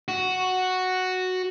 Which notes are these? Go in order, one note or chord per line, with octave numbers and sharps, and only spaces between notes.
F#4